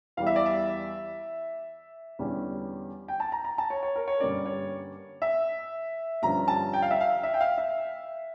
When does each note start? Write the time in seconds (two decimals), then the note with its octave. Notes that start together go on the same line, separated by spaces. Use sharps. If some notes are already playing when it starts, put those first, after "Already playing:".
0.17 E2 E3 G3 F5
0.27 E5
0.36 D5
0.46 E5
2.19 E2 D3 G3 C#4
3.08 G5
3.20 A5
3.32 A#5
3.44 A#5
3.58 A5
3.70 C#5
3.83 C#5
3.96 A#4
4.08 C#5
4.20 G2 D3 G3 A#3 C#4 D5
4.46 C#5
5.22 E5
6.22 G2 D3 F3 C#4 A#5
6.48 A5
6.73 G5
6.82 F5
6.91 E5
7.01 F5
7.23 E5
7.34 G5
7.40 F5
7.58 E5